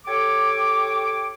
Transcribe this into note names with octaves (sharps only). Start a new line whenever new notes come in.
G4 A4 C#5 D6